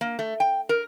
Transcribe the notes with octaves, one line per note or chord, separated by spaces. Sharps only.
A#3
A3
G5
A#4